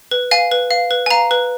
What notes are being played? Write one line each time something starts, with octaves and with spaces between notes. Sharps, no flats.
B4
F5 G#5
B4
F5
B4
G#5
F5 A#5
B4